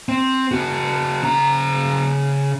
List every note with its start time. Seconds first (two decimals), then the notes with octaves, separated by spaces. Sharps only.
0.09 C4
0.52 C#3 F#4
1.23 C#3 A#5